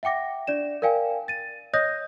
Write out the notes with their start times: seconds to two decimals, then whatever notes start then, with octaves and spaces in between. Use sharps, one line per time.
0.03 E5 F#5 G5 D6 A#6
0.47 D4 D5 E7
0.82 A#4 D5 F5 G5 G#5
1.28 A6 D#7
1.73 C#5 D#5 D#6 G6 A#6